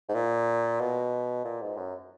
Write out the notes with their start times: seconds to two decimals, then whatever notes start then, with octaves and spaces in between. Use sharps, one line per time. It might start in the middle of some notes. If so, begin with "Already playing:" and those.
0.09 G#2
0.15 A#2
0.80 B2
1.45 A#2
1.62 G#2
1.77 F#2